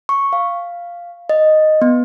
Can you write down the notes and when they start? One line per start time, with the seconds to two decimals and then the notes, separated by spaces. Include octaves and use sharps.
0.09 C#6
0.33 F5
1.29 D#5
1.82 B3